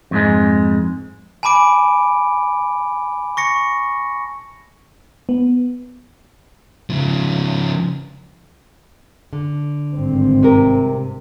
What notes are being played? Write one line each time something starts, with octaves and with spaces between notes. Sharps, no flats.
F2 G#2 G#3
G#5 A5 B5 D6 D7
C#6 A#6 C#7
B3
C#3 F3
D3
G#1 G2 C4
C3 A#4